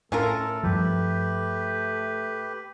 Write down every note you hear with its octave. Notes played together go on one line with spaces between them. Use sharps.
A2 A3 C#4 F4 A4 A#4
G2 F3 G4 B4